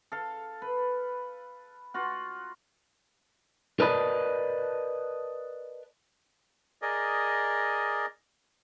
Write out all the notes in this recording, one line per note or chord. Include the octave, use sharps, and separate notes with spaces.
A4 F5
B4
F4 F#4 F#5
A#4 B4 D5 D#5 A5 B5
G#4 A#4 D5 D#5